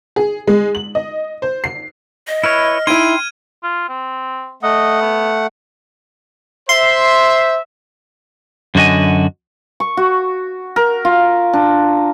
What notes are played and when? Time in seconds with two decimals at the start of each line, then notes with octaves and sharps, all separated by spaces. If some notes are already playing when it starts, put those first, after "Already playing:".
0.16 G#4
0.47 G#3
0.75 F#7
0.95 D#5
1.42 C5
1.64 C7
2.28 D#5
2.44 E4 B4 C#5 F6
2.87 D#4 E4 G5 C6 G#6 D#7
3.63 F4
3.88 C4
4.63 A3 D#5 F#5
5.01 B3
6.69 C5 E5 C6
8.75 F#2 D3 F#4 D#5 G#5
9.80 C#6
9.97 F#4
10.76 A#4
11.05 F4
11.53 D4